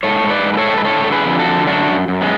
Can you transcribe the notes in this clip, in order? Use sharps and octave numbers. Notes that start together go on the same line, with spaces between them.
G#2 A4 C#5
G#2
B4 D5
G#2
B4
A4 C#5
G#2
B4
D3 A4 C#5
D3 A4
G#4 B4
F2
F#4 A4
D3
F#2 D4 F#4
F#2
F#2
G#3 B3